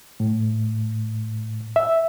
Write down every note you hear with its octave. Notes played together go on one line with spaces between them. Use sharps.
A2
E5